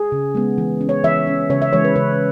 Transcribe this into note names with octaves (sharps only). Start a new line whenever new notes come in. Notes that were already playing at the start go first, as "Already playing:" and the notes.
Already playing: G#4
C#3
G#3 B3
E3
C#4
C#5
E3 E5
C#4
C#3 C#5
E5
E3 G#3 C#5
B4
C#3 B4